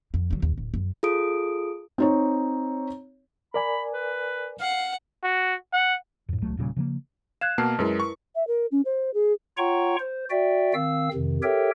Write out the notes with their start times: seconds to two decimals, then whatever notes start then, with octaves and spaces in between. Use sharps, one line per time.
0.14 F2
0.30 D3 F#3
0.42 D#2
0.58 D1
0.74 F#2
1.03 F4 G#4 A4 D#6 D7
1.98 C4 D#4 C#5
3.54 A#4 D5 G#5 B5
3.93 B4
4.60 F5 F#5
5.24 F#4
5.73 F#5
6.29 F2 A2
6.42 D#1 C#2 F#3 A3
6.57 E1 A#2 C#3 G3
6.76 C#3 F3 G#3 A#3
7.41 F5 F#6 G#6 E7
7.58 B2 A#3 A5 F6 C7
7.79 F#2 G#3 E4 A#4 B4
8.00 C#6
8.35 E5
8.47 A#4
8.72 C#4
8.85 C5
9.14 G#4
9.58 F4 C#5 F#5 G5 A#5 C#6
10.00 C5
10.30 F#4 D5 E5 G5
10.74 D#3 C4 F5 E6
11.13 F2 C3 D#3
11.43 G4 A4 A#4 C#5 E5 G5